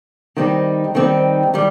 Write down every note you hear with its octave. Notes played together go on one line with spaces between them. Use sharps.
D#3 G3 C4 D#4
D#3 G3 C4 D#4
D#3 G3